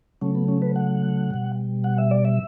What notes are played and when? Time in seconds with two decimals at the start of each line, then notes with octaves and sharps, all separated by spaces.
0.21 C#3 F#3 A3 C#4
0.35 B3
0.48 C#4
0.62 B4
0.76 F#5
1.31 B2 G3
1.84 F#5
1.98 E5
2.11 D5
2.25 E5